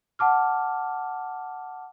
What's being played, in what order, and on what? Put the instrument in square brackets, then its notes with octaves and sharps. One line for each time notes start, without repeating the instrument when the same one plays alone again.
[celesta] F#5 A5 D6 F6